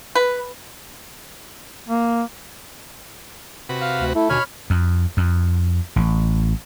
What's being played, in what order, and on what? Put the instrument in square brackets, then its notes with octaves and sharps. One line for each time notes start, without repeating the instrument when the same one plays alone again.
[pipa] B4
[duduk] A#3
[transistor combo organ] C3 F#4 B4
[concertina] F5
[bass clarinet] D2
[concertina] A3 [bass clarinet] E4
[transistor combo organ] D#2 D3 G#5 [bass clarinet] B2 [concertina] C#5 B5 F6
[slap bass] F2
F2
A1